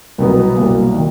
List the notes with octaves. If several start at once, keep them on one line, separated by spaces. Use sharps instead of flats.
C2 B2 F#3 B3
C2 B2 F#3 A#3
D#3